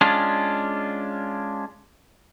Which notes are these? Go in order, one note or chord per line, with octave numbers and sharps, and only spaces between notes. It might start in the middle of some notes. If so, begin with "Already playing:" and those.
G#3 C#4 D4 F4